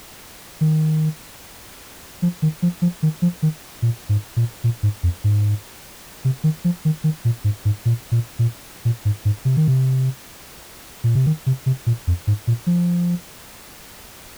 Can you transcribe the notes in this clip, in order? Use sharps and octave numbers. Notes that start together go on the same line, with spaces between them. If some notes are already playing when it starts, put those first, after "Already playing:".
D#3
F3
D#3
F3
F3
D#3
F3
D#3
A#2
G#2
A#2
A#2
G#2
F2
G#2
C3
D#3
F3
D#3
D#3
A#2
G#2
G#2
A#2
A#2
A#2
A#2
G#2
G#2
C3
D#3
C3
A#2
C3
D#3
C3
C3
A#2
F2
G#2
A#2
F3